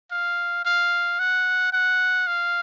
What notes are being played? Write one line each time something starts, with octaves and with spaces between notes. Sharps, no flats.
F5
F5
F#5
F#5
F5